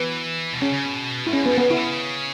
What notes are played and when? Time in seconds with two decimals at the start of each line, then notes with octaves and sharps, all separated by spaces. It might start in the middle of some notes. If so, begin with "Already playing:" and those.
Already playing: E3 B3
0.54 B2
0.61 C#3 C#4
0.73 C#3
0.86 B2
1.27 G#2 E4
1.33 B2 C#4
1.43 G#2 B3
1.52 B2
1.58 C#3 B3
1.70 C#3 E4
1.77 E3
1.84 C#3